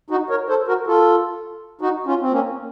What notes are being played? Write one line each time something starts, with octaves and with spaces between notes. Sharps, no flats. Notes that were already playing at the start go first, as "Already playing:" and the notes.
D#4 F#4
A#4 C#5
A4 C5
F#4 A#4
F4 A4
D#4 F#4
C#4 F4
C4
A#3 C#4